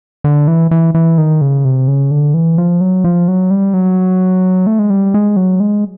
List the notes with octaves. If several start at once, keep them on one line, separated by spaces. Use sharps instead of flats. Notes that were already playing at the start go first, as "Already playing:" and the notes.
D3
E3
E3
E3
D#3
C#3
C3
C#3
D3
E3
F3
F#3
F3
F#3
G3
F#3
A3
G#3
G3
G#3
F#3
G#3